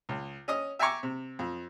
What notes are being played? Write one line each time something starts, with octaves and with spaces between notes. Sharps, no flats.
C#2
C#4 D#5 D#6
E5 G5 G#5 A#5 C#6 D6
C3
F2